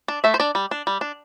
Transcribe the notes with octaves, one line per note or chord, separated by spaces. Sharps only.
D4
A3 E5
C5
D4 D5
G3
D4
G3
D4